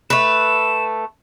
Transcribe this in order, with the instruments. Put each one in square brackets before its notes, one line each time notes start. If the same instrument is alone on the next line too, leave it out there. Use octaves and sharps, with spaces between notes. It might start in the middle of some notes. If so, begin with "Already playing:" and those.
[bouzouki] A3 B4 [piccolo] E7